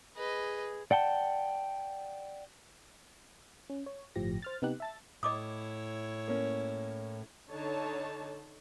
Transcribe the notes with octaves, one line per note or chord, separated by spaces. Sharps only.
G#4 B4 D#5
D5 F#5 G5 A5
C#4
C#5
G1 A2 F3 G4 A#6
C5 F6 A6
C3 B3 D#4 G4 F#6
E5 A5 A6
A2 E4 C#5 D#5 D6 D#6
A#3 C#4
D3 D#4 C#5 A5